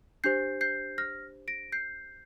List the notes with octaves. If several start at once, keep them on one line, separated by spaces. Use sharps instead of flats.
D4 G4 C5 G6 C7
G6 C7
F6 A#6
A#6 D7
G6 C7